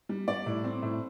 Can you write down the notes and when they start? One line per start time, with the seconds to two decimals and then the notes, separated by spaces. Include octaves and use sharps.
0.09 G3
0.28 G3 D5
0.46 A2
0.64 C4
0.83 A2